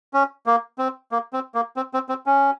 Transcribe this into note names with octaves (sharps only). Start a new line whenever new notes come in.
C#4
A#3
C4
A#3
C4
A#3
C4
C4
C4
C#4